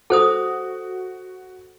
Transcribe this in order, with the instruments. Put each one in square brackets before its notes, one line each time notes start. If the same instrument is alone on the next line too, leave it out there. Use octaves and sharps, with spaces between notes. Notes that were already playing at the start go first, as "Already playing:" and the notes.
[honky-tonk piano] F#4 [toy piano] A4 C5 D#6